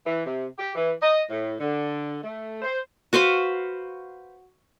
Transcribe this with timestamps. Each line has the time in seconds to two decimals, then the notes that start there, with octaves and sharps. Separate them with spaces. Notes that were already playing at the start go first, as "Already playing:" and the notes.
0.06 E3
0.25 C3
0.58 G4
0.75 E3
1.02 D#5
1.30 A2
1.60 D3
2.23 A3
2.62 C5
3.13 F#4 B4 C5 F5